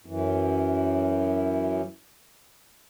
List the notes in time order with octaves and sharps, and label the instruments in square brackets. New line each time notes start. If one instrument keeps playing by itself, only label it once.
[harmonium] F#2 E3